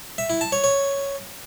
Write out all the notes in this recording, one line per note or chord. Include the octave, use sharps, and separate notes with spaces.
E5
E4
A5
C#5
C#5